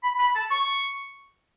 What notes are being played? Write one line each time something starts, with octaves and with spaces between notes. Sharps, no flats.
B5
B5
A5
C#6